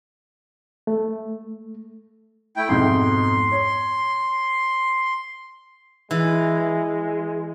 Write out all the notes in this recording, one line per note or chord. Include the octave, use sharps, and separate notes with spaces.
A3
A3 E4 G5
F2 G#2 B2 C6
C#5
E3 G#3